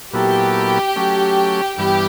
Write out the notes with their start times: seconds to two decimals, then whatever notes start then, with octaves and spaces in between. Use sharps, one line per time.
0.13 A#2 F#3 B3 E4 G4 A4
0.96 F#3 A3 C#4
1.78 G2 E3 G3 B3 G4